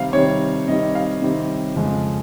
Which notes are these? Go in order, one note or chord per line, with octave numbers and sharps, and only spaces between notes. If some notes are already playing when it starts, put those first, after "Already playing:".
Already playing: C3 D#3 G3 C4 F5
C3 D#3 G3 C4 C#5
C3 D#3 G3 C4 D#5
F5
C3 D#3 G3 C4
F2 C#3 G#3